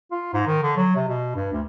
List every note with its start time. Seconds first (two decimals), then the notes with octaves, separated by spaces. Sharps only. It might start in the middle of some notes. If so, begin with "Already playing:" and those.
0.12 F4
0.33 G#2
0.47 D#3
0.63 D3
0.77 F#3
0.96 C3
1.08 B2
1.36 G2
1.53 D2